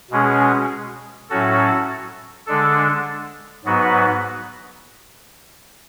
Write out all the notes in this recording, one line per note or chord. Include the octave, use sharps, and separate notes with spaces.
B2 G#3 C#4 G#4
A2 F#3 C#4 F#4 A4
D3 G#3 D4 A4
G#2 F#3 B3 F#4 B4